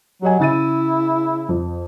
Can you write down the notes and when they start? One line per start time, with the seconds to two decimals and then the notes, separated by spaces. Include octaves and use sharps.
0.22 F#3 G4 D#5 G#5
0.40 C#3 E4 A6 D#7
1.49 F2